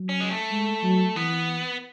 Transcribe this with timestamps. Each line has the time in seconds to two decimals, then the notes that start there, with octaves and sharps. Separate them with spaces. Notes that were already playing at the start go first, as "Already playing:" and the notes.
Already playing: F#3
0.09 C#4
0.20 G#3
0.31 A3
0.51 G#3
0.83 F#3
1.16 E3 B3